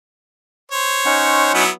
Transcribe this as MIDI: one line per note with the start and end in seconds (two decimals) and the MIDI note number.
0.72 1.51 72
0.72 1.51 73
1.05 1.64 61
1.05 1.64 63
1.05 1.64 78
1.54 1.69 54
1.54 1.69 59
1.54 1.69 64